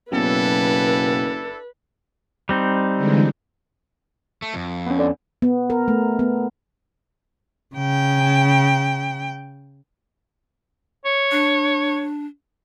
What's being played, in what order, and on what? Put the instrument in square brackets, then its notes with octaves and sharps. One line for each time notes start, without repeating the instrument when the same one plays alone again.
[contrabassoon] F#1 [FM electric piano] B2 F#3 [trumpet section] D4 E4 A4 [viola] B4
[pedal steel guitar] G3 C4 D#4
[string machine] D3 E3 G#3
[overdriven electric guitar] A3
F2
[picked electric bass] B3 C#4
[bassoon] D3
[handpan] B3
A#4
A3
B3
[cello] C#3 G5
[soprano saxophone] C#5
[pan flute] D4